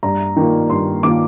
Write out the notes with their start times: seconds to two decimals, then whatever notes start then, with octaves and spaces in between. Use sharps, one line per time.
0.03 G2 A#5
0.37 D#3 A#3 F4
0.70 G2 C6
1.03 D#3 A#3 F4 D6